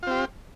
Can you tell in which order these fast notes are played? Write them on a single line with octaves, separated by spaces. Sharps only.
F4 C4 G4